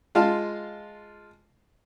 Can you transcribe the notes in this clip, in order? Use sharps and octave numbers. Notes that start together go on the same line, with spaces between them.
G#3 F4 F5 A5